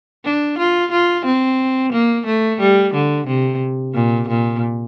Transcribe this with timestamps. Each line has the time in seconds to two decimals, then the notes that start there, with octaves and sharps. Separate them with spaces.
0.25 D4
0.58 F4
0.92 F4
1.25 C4
1.92 A#3
2.26 A3
2.60 G3
2.94 D3
3.27 C3
3.94 A#2
4.29 A#2